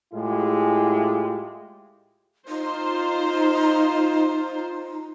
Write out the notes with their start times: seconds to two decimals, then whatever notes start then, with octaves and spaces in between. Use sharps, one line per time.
0.14 A2 G#3 E4 F4 G4 G#4
2.48 D#4 F4 C5